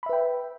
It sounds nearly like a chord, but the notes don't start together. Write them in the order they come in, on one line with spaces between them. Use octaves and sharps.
B5 E5 B4 G5